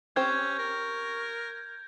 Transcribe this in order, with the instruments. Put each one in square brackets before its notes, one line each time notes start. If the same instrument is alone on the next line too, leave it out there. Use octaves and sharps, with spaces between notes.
[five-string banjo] C4 G4 C5 [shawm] C#4 [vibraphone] C#6 [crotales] G6 G#6
[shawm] A#4